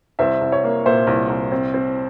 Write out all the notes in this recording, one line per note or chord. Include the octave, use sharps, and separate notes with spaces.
C2 C5 E5
C2
C#5
A#3
A#2 C5 E5
C2
C2
C4
C4